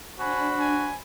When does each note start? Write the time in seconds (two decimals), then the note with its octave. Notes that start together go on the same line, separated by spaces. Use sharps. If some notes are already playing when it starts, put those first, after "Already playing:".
0.19 D4 F#4 C5 G#5 B5
0.59 G#5